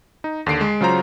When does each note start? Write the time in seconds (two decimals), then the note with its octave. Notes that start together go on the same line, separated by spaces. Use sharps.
0.24 D#4
0.46 D#2 D3 C7 D7
0.61 G#3
0.81 C#3 F#3 F4 C5 A#5